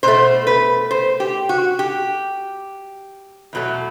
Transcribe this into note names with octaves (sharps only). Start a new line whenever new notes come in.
B2 A3 C5
B4
C5
G4
F#4
G4
E2 B2 F#3 A3